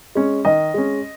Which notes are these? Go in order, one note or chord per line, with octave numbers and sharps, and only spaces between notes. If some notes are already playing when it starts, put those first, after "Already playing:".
G#3 C#4
D#3 D#5
G#3 C#4